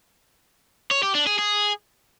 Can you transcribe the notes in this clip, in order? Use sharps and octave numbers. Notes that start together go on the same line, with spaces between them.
C#5
G4
D4
G#4
G#4